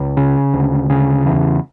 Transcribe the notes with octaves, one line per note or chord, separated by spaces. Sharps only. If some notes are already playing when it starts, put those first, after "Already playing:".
Already playing: C#2
C#3
D2
C#3
E2